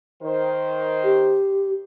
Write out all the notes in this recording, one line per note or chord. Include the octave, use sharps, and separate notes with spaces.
D#3 C5
G4